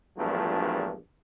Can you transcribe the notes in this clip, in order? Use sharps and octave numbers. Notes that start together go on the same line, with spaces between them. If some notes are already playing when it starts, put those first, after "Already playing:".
A#1 E2 G2 F3 F#3 A3